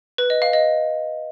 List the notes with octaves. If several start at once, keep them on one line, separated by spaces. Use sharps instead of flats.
B4
D#5
F5
D#5